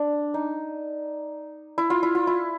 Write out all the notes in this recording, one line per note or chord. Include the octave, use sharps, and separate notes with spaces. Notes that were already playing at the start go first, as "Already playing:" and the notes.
Already playing: D4
D#4
E4
F4
E4
F4
E4